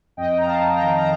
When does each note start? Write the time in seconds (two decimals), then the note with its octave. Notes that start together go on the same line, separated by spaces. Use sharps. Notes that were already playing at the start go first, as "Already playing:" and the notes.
0.17 F2 D#5 G5
0.38 F2 A#5
0.45 F5 A5
0.60 F2
0.74 G5 A#5
0.81 D#3
0.98 A#5